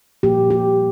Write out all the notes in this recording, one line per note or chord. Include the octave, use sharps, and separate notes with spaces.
A#2 F3 A#3 G4
G4